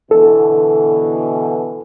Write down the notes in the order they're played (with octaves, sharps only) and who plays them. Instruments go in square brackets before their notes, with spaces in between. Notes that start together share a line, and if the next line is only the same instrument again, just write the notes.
[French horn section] B2 D3 E3 [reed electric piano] A4